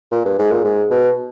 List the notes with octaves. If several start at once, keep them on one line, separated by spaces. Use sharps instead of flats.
A#2
G2
G#2
A#2
G#2
B2